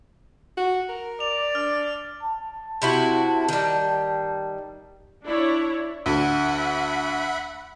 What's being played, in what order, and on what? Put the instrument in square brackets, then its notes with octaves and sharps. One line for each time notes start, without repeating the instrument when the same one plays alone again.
[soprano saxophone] F#4
A#4
[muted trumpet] D5 [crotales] F7
[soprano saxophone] D4 [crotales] F6
[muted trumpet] A5
[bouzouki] C3 E4 F#4
D#3 G3
[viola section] D4 E4 C#5 D5
[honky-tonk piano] D2 [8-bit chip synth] E5 F#5 B5